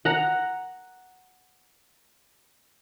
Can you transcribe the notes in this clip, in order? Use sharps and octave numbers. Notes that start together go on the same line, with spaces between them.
F#5 A#5